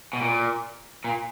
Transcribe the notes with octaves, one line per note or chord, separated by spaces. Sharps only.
B2
A#2
A#2